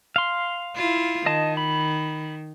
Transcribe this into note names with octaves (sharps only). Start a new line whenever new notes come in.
F5 C6
E4 F4
D#3 D#5 A5
B5